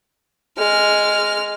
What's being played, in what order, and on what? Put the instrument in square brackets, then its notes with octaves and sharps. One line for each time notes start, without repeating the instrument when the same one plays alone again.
[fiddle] G#3 F6